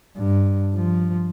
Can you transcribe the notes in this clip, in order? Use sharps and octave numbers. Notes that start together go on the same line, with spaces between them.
G2
F3